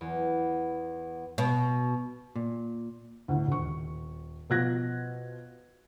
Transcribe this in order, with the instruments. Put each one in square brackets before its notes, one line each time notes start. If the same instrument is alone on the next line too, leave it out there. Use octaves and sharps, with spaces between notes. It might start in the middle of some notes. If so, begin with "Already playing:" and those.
[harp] E2
[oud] B2
[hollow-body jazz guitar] A#2
[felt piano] D2 A2
D#1 C#6
B2 F3 F#6 G#6 A#6